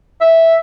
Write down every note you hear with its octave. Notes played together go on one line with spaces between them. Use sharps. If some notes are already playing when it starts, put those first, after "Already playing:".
E5